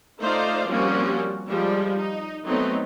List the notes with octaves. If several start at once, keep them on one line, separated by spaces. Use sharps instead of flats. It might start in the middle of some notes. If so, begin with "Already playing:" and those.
A3 D#4 F4 C5 D5 F5
F3 G3 A#3 C4 C#4 F#4
F3 G3 G#3
D#4
F#3 A3 B3 C4 D#4